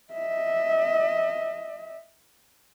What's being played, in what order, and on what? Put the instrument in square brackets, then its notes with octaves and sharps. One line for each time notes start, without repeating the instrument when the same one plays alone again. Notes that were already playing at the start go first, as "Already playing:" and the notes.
[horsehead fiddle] D#5 E5